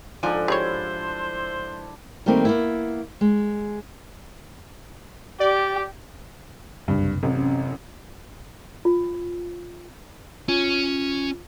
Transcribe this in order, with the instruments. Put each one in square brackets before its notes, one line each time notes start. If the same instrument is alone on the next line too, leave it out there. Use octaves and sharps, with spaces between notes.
[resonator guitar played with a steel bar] G#2 F3 G#5 [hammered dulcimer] D4 A4
[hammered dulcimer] E4 [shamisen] G4 G#4 C#5 [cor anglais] C5
[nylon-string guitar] D#3 G3 A3 A#3 C4
A#3 B3 E4
G#3
[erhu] G4 [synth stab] D5
[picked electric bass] F#1 C2 [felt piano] G2
[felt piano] A1 F#2 [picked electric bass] C3
[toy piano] F4
[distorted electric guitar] C#4 [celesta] F4